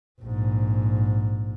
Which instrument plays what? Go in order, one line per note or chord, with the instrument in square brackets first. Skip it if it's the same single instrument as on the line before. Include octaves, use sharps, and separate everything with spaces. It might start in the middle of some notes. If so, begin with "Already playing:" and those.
[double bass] A#1 G#2